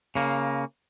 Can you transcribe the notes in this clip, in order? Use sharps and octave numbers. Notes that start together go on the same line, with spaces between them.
C#3 A#3